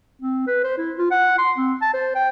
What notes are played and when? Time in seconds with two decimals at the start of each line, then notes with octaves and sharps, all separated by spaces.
0.21 C4
0.47 B4
0.64 C5
0.77 E4
0.98 F4
1.11 F#5
1.38 C6
1.57 C4
1.81 A5
1.93 C5
2.15 G5